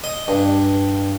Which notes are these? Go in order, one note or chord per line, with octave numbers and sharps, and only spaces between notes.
D#5
G2